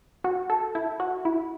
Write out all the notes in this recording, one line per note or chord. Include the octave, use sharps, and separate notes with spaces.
F#4
A4
E4
F#4
E4